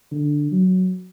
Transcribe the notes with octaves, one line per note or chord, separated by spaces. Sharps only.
D3
F#3